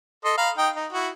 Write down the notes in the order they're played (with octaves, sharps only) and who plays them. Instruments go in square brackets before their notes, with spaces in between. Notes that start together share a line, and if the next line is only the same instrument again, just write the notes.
[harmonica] A4 D#5 C6
F5 A#5 B5
D#4 G5 D#6
D#4
E4 F#4